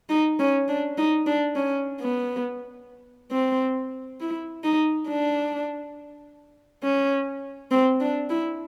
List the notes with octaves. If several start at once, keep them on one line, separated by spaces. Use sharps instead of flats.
D#4
C#4
D4
D#4
D4
C#4
B3
C4
E4
D#4
D4
C#4
C4
D4
E4